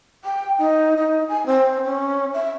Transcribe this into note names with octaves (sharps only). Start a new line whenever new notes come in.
G5
D#4
D#4
G#5
C4
C#4
E5